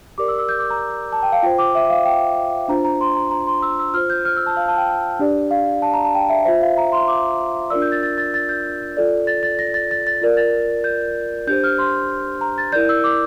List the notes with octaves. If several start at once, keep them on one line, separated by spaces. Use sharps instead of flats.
G4 A#4 D5 D6
E6
E6
G6
D6
A#5
A5
G5
F5
F4 C5 G5
D6
E5
F5
G5
D4 F4 C5 A#5
A#5
C6
A#5
A#5
C6
E6
E6
F4 C5 F6
G6
F6
E6
A5
F5
A5
G5
D4 G4 D5
F5
A5
A#5
A5
G5
E5
F4 C5 E5
F5
A#5
C6
D6
D4 F4 A#4 D5 E6
G6
A6
A6
A6
A6
G6
F4 A4 D5
A6
A6
A#6
A6
A6
A6
F4 A#4 D5
A6
G6
D4 G4 C5 G6
F6
C6
A#5
A6
E4 A#4 D5 G6
E6
D6